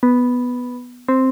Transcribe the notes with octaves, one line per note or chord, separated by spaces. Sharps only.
B3
C4